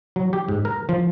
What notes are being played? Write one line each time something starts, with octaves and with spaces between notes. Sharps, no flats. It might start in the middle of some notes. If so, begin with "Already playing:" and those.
F#3
G4
G#2
A#4
F3